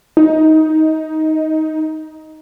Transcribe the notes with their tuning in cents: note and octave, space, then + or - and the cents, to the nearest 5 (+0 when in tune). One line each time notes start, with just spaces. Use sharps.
D#4 +10